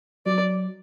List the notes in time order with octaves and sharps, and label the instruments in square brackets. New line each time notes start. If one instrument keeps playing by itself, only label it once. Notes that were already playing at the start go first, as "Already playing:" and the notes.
[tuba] F#3 [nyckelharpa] D5